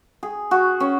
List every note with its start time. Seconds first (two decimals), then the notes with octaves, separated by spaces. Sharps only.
0.23 G#4
0.51 F#4
0.80 C#4